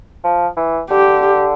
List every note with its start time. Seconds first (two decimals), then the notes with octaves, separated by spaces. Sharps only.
0.24 F3
0.57 E3
0.90 D3 G4